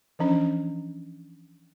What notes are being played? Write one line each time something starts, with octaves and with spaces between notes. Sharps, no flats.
E3 F3 C#4 D4